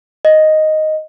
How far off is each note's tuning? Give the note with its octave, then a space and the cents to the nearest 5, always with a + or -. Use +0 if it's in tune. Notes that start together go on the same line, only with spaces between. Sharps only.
D#5 +0